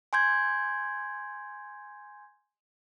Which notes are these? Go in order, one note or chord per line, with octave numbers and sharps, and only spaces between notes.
G#5 C6 G6 G#6